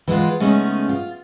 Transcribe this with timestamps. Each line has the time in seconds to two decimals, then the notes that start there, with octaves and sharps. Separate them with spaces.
0.08 E3 G#3 B3 F4
0.40 C#3 G#3 A3 B3 C#4 D#4
0.89 F4